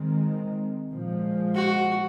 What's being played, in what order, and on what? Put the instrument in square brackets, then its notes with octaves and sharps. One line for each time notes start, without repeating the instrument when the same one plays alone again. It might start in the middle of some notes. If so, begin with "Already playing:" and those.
Already playing: [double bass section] D#3 G#3 C4
A#2 F3 G#3
[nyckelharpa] F#4